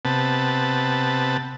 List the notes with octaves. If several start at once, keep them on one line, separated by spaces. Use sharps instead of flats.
C3 B3 A5